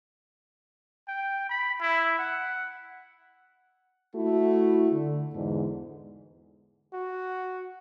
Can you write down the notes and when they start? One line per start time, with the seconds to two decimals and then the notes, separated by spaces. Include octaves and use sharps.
1.08 G5
1.49 B5
1.81 E4
2.19 F#5
4.14 A3 E4 F#4
4.91 D3
5.33 E2 G#2 D3
6.93 F#4